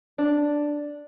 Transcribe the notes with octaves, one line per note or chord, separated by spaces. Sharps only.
D4